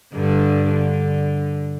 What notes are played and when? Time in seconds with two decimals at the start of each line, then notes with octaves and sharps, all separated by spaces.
0.14 G2 D3
0.67 D3